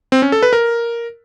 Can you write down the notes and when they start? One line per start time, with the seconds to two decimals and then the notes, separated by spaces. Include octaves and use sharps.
0.12 C4
0.22 C#4
0.32 A4
0.42 B4
0.53 A#4